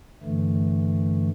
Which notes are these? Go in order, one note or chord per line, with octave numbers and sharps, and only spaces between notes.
G2 D3 E3 A3